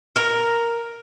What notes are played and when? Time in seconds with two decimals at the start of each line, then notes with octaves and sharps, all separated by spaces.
0.16 A#4 A#5